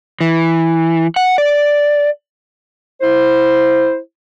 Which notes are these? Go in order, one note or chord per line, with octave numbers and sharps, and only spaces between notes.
E3
F#5
D5
E4 C5